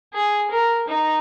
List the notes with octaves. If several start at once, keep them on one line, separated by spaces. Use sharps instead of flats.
G#4
A#4
D#4